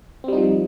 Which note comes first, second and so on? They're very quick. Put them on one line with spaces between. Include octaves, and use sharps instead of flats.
C4 G3 D#4 F3